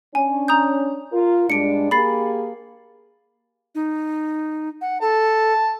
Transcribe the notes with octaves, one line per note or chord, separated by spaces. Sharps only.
C#4 D4 G#5
A#5 D#6 G6
F4 A#4
G2 G#3 D4 C#7 D7
A#3 G4 G#4 B5 A6 C7
D#4
F#5
A4 A5